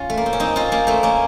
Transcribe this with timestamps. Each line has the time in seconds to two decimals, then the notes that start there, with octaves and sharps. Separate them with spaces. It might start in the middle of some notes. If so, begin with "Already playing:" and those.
Already playing: C#4 F4
0.10 A3
0.17 A#3
0.26 C4
0.33 C#4
0.40 C4 D#4
0.56 C#4 F4
0.72 A#3 C#4
0.87 A3 C4
1.03 A#3 C#4